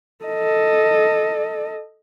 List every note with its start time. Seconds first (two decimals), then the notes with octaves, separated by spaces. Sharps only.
0.24 A4 D#5